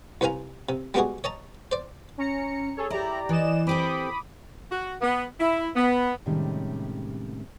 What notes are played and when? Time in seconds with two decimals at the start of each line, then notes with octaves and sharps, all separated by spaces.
0.21 C2 B4 C5 F5 G#5 A#5
0.69 C3
0.94 G3 G#3 B3 D4 F#4 G#4
1.24 C#5 D#5 A5 A#5
1.72 C5 D5
2.18 C#4 A#5 C#7
2.76 G#4 A4 C#5
2.90 E4 G4 D5 A#5
3.29 E3 D5 D#5 E7
3.67 C4 G4 A4 B5 D6 D#6
4.71 F#4
5.02 B3
5.39 E4
5.75 B3
6.26 A2 C3 D#3 G3 G#3 C#4